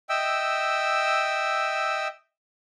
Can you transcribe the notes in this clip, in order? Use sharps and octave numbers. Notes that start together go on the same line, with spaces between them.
D#5 E5 G5 E6